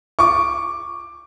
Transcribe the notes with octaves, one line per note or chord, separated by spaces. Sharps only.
C#6 D6